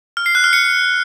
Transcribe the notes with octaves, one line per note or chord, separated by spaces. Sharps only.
F6
C7
F#6
F6
C#7